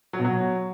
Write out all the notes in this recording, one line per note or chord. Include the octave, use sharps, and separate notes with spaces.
F#3
B2
F#3